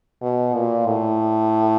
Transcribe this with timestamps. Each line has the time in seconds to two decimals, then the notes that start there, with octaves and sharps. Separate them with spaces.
0.22 B2
0.54 A#2
0.86 A2